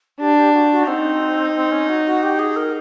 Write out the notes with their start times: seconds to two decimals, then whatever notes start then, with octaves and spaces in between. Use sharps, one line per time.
0.20 D4 G4
0.37 G4
0.54 F#4
0.71 F#4
0.87 C4 D#4
1.55 C4
1.72 C#4
1.89 F#4
2.06 F#4
2.23 G4
2.39 G#4
2.56 A#4